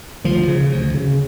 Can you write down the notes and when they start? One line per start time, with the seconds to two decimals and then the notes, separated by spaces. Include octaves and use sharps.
0.24 D2 F3
0.48 C#3
0.71 D2
0.94 C#3